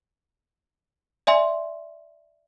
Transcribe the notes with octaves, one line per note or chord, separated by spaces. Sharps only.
D5 E5 G#5 C6